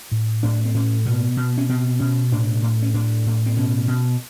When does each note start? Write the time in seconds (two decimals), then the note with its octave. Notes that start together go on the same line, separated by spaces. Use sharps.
0.12 A2
0.43 A2 D4
0.65 C4
0.74 A2 C#4
1.06 B2 B3
1.37 B2
1.58 C#4
1.69 B2 C4
2.00 B2 C#4
2.32 A2 D4
2.62 A2
2.82 C#4
2.94 A2 D4
3.26 A2
3.46 C4
3.57 B2 C#4
3.88 B2